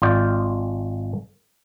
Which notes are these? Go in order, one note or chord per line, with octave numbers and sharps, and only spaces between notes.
G#1 F4 D5 G5